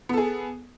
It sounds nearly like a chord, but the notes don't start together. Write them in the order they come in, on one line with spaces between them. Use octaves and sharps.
B3 A4 G#4